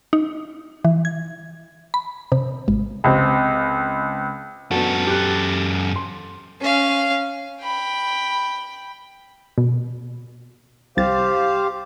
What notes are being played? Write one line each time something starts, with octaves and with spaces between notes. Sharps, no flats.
D#4
E3
G#6
B5
C3
G#1
C#2 C4
F#2 B3 D4 F#4 A4
G4 F#6
C6
C#4 F5
G5 B5
B2
C2 G4 C5 F5 A6